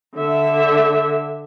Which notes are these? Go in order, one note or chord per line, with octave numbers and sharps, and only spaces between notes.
D3 E5